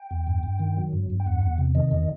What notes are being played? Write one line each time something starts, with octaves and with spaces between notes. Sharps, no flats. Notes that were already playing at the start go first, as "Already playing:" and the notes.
Already playing: G5
E2
G2
G2
D#3
F#3
G2
G2
G5
E2 F#5
E2
C3
D#3 D#5
E2